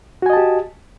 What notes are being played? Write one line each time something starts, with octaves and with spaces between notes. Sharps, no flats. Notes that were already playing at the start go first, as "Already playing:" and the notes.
F#4 G4 D#5 G#5 A5